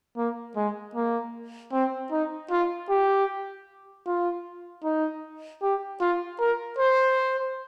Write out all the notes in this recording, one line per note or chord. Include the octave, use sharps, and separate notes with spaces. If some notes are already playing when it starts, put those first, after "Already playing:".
A#3
G#3
A#3
C4
D#4
F4
G4
F4
D#4
G4
F4
A#4
C5